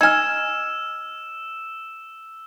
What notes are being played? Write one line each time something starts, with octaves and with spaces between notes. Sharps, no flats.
D#4 G#5 E6 F6 G#6 E7